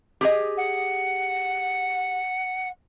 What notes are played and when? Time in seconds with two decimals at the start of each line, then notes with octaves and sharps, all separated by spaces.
0.21 G4 G#4 D#5
0.57 F#5